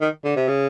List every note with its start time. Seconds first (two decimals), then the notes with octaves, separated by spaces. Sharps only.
0.01 D#3
0.25 D3
0.36 C3
0.48 C#3